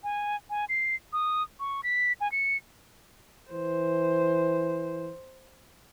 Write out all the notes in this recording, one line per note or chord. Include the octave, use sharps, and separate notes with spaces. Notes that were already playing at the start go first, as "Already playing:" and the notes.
G#5
G#5
C7
D#6
C#6
B6
G#5
C#7
E3 C5